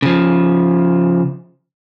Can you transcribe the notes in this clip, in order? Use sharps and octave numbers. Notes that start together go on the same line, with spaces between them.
C#3 F3